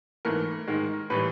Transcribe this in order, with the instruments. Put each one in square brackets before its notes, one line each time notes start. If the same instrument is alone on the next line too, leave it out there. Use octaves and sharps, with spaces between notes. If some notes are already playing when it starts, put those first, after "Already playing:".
[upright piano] G#2 E3 A3 A#4
G#2 D#3 G#3
A2 E3 G3 B4